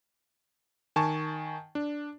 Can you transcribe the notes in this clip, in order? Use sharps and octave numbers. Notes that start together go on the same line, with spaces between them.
D#3 G#5 A5 C#6
D4